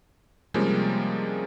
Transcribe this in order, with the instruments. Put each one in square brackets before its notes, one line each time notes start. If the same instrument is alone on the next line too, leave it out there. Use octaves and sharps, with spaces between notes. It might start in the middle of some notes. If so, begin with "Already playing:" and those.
[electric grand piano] C3 F3 G3 G#3 A#3 C#4